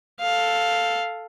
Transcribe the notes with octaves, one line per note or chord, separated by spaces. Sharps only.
A4 F5